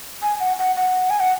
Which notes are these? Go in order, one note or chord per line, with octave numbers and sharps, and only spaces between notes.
G#5
F#5
F#5
F#5
G#5
F#5